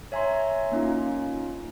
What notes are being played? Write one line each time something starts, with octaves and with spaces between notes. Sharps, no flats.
C#5 E5 G#5 A#5 C6
A#3 C#4 D#4 F4